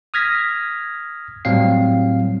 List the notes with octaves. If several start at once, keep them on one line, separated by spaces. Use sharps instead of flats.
D#6 F6 G#6 A#6 B6
A2 F#3 G3 C4 F5 C7